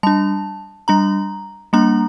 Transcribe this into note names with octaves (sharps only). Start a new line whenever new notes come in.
G3 D4 A5
G3 D4 A#5
G3 A#3 D4 A#5